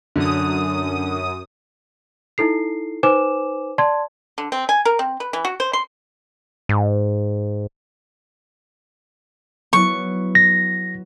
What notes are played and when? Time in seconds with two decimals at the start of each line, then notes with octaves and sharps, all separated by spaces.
0.16 F#2 D3 D#6
2.38 D#4 E4 A4 C7
3.03 D#4 B4 C5 G#5 D6 E7
3.78 D5 A5 C6 G#6
4.38 D3
4.52 C4
4.69 G#5
4.85 A#4
4.99 C4
5.20 B4
5.33 E3
5.45 F#4
5.60 C5
5.73 C6
6.69 G#2
9.73 F#3 B3 E4 C#6
10.35 A#6